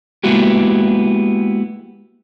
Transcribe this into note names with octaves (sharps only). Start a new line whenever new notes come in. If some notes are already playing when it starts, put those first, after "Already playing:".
G#3 A#3 B3 E4 F#4 G4